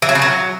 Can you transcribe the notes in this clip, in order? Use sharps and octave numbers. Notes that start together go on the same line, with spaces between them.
E3
F#3
C#3
F#3